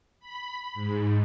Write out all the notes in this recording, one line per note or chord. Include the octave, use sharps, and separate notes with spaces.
B5
G#2